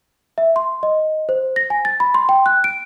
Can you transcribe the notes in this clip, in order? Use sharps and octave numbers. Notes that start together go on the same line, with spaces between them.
E5
C6
D#5
C5
A#6
G#5
A6
B5
C6
G5
F#6
D7